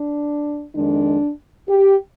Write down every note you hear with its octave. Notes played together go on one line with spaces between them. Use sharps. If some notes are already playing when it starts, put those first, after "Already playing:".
Already playing: D4
F2 D#3 G#3 D4
G4